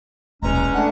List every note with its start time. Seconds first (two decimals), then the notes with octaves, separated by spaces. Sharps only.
0.42 D#1 B1 E2 G#3 C#4 A#5
0.74 A3 A#3 D4 F#5